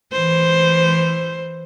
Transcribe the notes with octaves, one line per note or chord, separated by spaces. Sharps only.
E3 C5